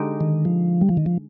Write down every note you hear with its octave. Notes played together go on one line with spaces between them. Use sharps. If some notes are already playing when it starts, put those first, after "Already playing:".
Already playing: D3 G#3 D#4 G4
D#3
F3
G3
F3
D#3
F3